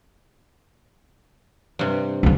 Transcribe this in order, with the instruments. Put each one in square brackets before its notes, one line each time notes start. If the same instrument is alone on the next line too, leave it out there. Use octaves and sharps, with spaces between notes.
[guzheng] G2 C3
[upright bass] D3 A#3